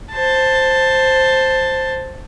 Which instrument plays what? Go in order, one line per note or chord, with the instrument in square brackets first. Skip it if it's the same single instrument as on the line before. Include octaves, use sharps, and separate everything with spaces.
[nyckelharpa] C5 A5